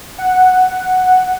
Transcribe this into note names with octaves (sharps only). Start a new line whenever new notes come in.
F#5